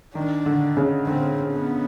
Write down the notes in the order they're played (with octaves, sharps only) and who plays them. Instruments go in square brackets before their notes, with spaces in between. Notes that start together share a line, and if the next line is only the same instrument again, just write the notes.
[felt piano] D#3 [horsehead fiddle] D4
[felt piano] D3
C#3
[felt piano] D3 [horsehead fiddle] C4
[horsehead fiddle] B3